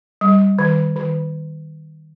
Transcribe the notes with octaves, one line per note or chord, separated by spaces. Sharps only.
G3
D#3
D#3